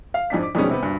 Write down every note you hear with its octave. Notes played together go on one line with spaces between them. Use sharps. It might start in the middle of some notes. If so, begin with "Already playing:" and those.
F5
F2 G#2 D4 B6
D6
F2 B2 D#3 G3 G#3 C#4
C3 B3
D2 G2